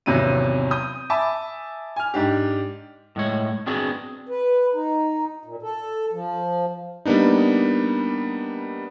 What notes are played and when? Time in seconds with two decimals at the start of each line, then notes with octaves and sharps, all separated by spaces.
0.06 G#1 E2 C3 F#3 C#4 D#7
0.71 D#6 G6
1.10 E5 G#5 A5 B5 D6
1.96 G#5 F6
2.14 G#2 D4 G4
3.16 A2 G#3 C#5
3.66 B3 C4 D4 F#4 G#4
4.29 B4
4.74 D#4
5.45 A#2
5.62 A4
6.13 F3
7.05 G3 A#3 B3 D4 D#4